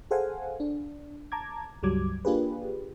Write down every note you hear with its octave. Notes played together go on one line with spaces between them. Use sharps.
G#4 A4 C5 F5 F#5 G#5
D4
A5 A#5 D6 G#6
C#2 G2 F#3 G3 D6 G#6
A#3 D4 F4 G4 G#4 B4